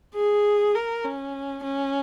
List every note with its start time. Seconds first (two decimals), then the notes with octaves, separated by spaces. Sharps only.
0.15 G#4
0.75 A#4
1.04 C#4
1.63 C#4